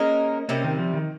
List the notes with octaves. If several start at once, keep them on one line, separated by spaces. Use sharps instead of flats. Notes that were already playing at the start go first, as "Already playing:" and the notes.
Already playing: G#3 A#3 C#4 D#4 A#4
C3 G3 A#3 C4 C#4
D#3
F3
D#3